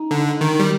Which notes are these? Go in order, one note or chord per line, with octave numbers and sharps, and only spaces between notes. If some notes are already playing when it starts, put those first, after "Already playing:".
Already playing: D#4
D3
D#3
G3